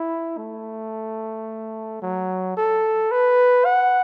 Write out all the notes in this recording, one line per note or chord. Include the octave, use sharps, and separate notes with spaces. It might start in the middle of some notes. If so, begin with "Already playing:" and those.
Already playing: E4
A3
F#3
A4
B4
F#5